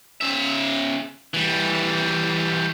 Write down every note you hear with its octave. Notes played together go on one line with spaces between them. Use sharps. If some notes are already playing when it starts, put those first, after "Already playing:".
C#3 E5
E3 G3